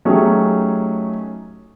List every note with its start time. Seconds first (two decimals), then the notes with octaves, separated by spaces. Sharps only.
0.05 F#3 A3 C#4 D#4 G4 G#4